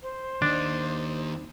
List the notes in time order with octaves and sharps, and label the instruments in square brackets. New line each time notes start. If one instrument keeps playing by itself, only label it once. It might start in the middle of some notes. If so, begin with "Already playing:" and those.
[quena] C5
[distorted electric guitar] D#2 D#4 [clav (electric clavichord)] D4